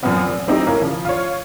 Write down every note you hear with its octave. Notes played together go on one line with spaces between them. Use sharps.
F#2 A#2 F3 B3 C4
F1
F#3 A3 C4 D#4 E4 G4
A#3 C#4 E4 A#4
C#3 F3
F4 C#5